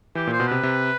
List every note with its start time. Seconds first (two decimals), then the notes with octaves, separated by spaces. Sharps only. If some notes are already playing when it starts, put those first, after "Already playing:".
0.15 E3 G4
0.27 A#2
0.33 C5
0.40 B2
0.47 C3 B4
0.63 C3